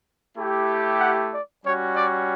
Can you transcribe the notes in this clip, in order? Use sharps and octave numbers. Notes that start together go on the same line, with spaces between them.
A3 E4 G4
F#5
D5
G3 C#4 F#4 C#5
D5